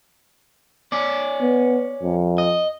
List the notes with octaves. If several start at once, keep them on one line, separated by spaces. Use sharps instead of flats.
C#4 D5
B3
F2
D#5